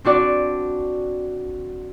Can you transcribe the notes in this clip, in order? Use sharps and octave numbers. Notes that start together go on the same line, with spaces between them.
C4 D4 F#4 D5